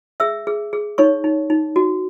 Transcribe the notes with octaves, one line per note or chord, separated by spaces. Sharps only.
G#4 E5 E6
G#4
G#4
D#4 C#5 C#6
D#4
D#4
F#4